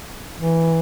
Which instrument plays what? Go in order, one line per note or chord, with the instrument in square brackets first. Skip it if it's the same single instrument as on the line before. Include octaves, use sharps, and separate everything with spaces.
[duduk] E3